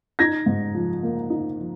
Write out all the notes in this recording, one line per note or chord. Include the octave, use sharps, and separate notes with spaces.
D#4 G#6 A#6
G#2
F3
A#3
D#4
F3